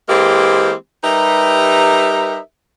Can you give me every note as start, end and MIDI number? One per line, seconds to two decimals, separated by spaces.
0.09 0.73 52
0.09 0.73 56
0.09 0.73 58
0.09 0.73 60
0.09 0.73 67
1.04 2.38 55
1.04 2.38 63
1.04 2.38 67
1.04 2.38 70
1.04 2.38 71
1.04 2.38 76